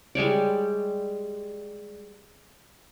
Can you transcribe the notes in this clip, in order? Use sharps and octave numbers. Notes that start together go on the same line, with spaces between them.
G3 G#3 C#5 D5